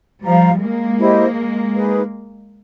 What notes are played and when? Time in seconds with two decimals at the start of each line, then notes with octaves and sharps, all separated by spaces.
0.24 F3 G3 C5 F5 A#5
0.61 G#3 A#3
1.00 E4 G4 C5 D#5
1.75 D#4 G#4 B4